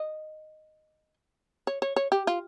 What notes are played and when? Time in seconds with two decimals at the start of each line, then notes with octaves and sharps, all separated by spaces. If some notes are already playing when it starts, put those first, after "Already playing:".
Already playing: D#5
1.67 C#5
1.82 C#5
1.96 C#5
2.12 G4
2.27 F4